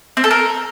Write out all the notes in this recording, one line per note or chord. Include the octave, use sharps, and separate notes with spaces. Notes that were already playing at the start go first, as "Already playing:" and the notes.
C4
A4
A#4